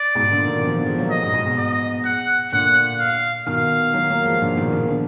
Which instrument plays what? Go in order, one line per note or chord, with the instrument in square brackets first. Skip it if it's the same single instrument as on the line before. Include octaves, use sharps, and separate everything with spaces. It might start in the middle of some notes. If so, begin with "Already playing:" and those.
Already playing: [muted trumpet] D5
[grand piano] G#2 B2
A#2 D3
B2 D#3
D3 F3
D3 F3
F3 G#3
F#3 A#3
[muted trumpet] D#5
[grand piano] G#2 B2
G#2 B2
G#2 B2
[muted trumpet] D#5
F#5
[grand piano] A#2 D3 [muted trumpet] F#5
[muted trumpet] F5
[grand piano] B2 D#3 [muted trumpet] F5
[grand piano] D#3 F#3
F#3 A#3
F3 G#3
A#2 D3
B2 D#3
B2 D#3
D3 F3